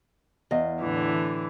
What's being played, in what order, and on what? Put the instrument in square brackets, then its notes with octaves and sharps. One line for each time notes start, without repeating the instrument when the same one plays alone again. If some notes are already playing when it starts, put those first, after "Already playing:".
[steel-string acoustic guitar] E2 [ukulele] D#5 F5
[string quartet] A2 D3 E3